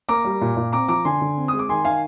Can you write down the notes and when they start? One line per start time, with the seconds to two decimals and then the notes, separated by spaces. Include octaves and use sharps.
0.09 A#3 A#5 D6
0.25 G3
0.41 A#2
0.57 A#2
0.72 C4 A#5 D6
0.88 F3 A#5 D6
1.05 D3 G#5 C6
1.21 D3
1.37 C4
1.48 G#3 D#6
1.59 D6
1.69 D#3 G#5 C6
1.84 D#3 F5 G#5